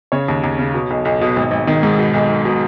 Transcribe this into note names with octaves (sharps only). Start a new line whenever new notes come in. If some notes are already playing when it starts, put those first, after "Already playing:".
C#3 C#5
D#2
D#2
C#3
B2
B1
B1
B2
G#1
G#1
D#3
G#2
B2
B1
B1
B2